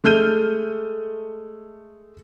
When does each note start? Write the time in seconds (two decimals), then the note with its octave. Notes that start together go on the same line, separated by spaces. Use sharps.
0.04 G#3 A3 F6 G6 D#7